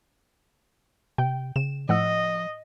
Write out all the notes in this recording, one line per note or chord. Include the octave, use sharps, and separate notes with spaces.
C3 G5
C#3 E7
A2 F3 D#5 F#5 E6